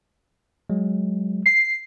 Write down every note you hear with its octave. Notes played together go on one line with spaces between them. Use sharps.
F#3 G#3
C7